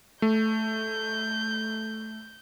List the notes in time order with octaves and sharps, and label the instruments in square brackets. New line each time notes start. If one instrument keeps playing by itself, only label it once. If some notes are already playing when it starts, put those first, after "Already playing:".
[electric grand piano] A3 [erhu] G6